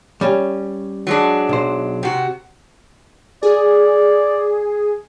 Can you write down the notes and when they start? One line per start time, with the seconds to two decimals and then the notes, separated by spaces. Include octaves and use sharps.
0.21 G3 C#4
1.07 F#3 G#3 D4
1.49 B1 C5
2.03 C3 F#4
3.43 G#4 D5